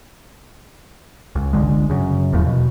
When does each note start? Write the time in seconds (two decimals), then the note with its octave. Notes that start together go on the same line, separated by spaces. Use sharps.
1.35 C#2
1.53 G1 D3 G#3
1.90 F#2 C#3
2.32 E1 D#2 A2 F3
2.47 B2